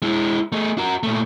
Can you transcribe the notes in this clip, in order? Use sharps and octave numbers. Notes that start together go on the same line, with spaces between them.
G#3 E4
A3 G#4
F#4 A#4
A#2 A3